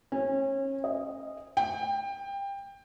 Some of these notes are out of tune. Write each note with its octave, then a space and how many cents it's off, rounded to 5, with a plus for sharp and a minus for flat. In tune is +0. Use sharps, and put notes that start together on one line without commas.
C#4 -30
D#5 -10
G5 +20